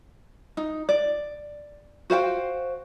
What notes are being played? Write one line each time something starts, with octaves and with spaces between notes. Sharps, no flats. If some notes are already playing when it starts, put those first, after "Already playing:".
D#4
D5
F#4 C5 F5 G5